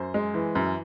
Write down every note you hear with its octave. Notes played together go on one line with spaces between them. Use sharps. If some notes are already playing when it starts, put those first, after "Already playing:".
Already playing: F#2 C5
G#3
E3
F#2